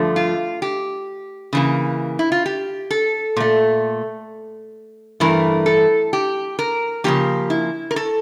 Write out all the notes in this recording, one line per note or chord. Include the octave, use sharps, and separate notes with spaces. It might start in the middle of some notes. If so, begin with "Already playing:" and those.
Already playing: G2 D3 F3 A3
F4
G4
C#3 E3 A#3
E4
F4
G4
A4
A#2 A3
G2 E3 A3 A#4
A4
G4
A#4
C#3 F3 A#3 G4
E4
A#4
A4